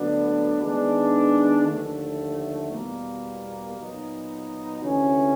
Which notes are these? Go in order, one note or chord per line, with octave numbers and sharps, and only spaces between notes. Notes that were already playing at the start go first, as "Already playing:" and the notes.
Already playing: D2 D3 F#3 B3 D4
D#3 G#3 B3 D4
D#2 D3 F3 A3
E2 B2 G3 A#3
A#2 F#3 B3 D#4
D2 C3 E3 A3 C#4